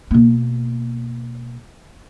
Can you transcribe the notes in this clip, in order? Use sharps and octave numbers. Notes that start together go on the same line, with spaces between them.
B2 A#3